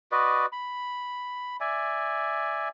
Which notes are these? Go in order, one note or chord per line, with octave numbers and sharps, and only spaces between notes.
F#4 B4 D5 D#5
B5
D5 E5 G#5